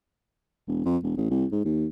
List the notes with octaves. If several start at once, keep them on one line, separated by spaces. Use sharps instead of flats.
E1
F2
E1
A1
C2
G#2
D#2